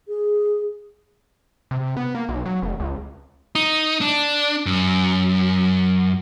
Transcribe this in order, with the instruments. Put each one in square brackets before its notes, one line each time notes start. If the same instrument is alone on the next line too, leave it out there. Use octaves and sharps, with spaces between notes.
[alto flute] G#4
[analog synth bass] C3
B3
A#3
B1
F#3
F1
C#2
[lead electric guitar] D#4
D4
F#2